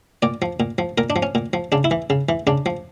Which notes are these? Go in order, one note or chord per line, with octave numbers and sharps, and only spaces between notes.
A#2 D5
F3
A#2
F3
A#2 A#4
D4
F3
C#4
A#2
F3
C#3 D4
E4
E3
C#3
E3
C#3 D4
F3